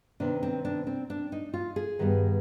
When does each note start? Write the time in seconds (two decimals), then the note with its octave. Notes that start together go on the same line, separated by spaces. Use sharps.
0.20 C3 D#3 B3 D4
0.43 C4
0.65 D4
0.87 C4
1.10 D4
1.32 D#4
1.54 F4
1.76 G#4
1.99 G2 D#3 G3 B3